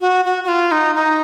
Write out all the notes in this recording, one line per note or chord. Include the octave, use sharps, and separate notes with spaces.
F#4
F#4
F#4
F4
D#4
D#4